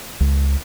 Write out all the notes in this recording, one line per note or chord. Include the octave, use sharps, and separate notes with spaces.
C#2